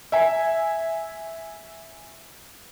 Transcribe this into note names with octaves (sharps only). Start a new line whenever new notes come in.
E5 G#5